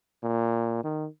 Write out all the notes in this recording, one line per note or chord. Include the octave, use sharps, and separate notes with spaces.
A#2
D#3